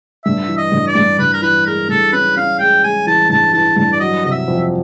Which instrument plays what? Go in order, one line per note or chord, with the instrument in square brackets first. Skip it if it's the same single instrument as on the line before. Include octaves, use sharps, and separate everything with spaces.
[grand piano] G2 [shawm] E5
[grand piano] E3
[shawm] D#5
[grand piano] G2
[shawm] D5
[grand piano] G2
[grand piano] G2 [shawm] B4
[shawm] A#4
[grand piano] E3 [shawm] B4
[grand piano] G#3 [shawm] A#4
[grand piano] G2 [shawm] A4
[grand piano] C#4 [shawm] B4
[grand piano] C#4 [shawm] F5
[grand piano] G#3 [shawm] G5
[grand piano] G#3 [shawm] G#5
[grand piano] E3 [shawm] A5
[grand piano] G2 [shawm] A5
[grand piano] E3 [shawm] A5
[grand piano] G2 [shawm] A5
[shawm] D5
[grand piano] F#3 [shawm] D#5
[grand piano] C3 [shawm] D#5
[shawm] E5
[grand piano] F2